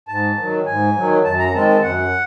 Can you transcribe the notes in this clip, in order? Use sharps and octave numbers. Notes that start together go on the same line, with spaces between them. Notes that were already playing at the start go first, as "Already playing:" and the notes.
G#2 A5
D#3 F#3
G#2 G#5
D#3 F#3
F#2 A5
A#5
D#3 G#3 C4 A5
A5
F#2 F#5